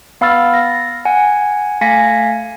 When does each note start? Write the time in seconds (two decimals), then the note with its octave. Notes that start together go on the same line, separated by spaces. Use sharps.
0.21 B3 F5 B5 E6 F6 A6
0.54 A#6
1.05 F#5 G#5
1.81 A3 F5 G#5 A#6 B6 C#7